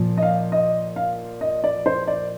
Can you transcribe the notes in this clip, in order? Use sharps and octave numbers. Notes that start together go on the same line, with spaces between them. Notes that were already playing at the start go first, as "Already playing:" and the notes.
Already playing: A#2 F3
D#5
F5
D#5
F5
D#5
D5
C5
D5